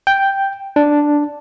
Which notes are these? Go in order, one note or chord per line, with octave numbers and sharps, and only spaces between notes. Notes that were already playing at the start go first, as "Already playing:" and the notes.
G5
D4